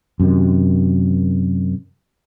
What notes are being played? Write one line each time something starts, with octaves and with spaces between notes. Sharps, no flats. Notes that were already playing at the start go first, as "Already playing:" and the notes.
F#2 C3 D#3